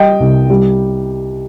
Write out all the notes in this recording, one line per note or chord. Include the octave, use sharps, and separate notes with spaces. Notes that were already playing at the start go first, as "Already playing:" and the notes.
Already playing: G3 D#5 G5
C2
G3